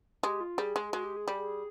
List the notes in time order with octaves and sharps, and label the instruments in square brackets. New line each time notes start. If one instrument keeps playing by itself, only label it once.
[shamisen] G#3 [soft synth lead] G4
[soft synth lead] F4
[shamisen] G3 [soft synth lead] G#4
[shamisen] G#3
[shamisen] G#3 [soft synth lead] F#4
[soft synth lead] G4
G#4
[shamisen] G3